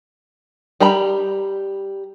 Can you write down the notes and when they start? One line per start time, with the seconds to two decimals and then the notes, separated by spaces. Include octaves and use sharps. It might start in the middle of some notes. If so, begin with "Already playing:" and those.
0.80 G3 G4 A#5 B5